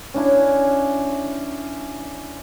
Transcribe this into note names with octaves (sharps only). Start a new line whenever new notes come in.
C#4 D4 E4